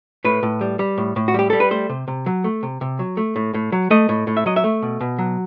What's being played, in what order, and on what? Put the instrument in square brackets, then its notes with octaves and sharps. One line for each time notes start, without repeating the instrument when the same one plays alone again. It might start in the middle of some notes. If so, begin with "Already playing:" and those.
[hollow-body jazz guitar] A2 B4
A2
G3
G3
A2
A2
F#4
G3 G4
G3 A4
B4
A3 C5
C3
C3
F#3
A3
C3
C3
F#3
A3
A2
A2
F#3
A3 D#5
A2
A2
E5
F#3 D#5
E5
A3
B2
B2
F#3